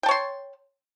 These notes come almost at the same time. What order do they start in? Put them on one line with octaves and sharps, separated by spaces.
G5 A5 C#5 C6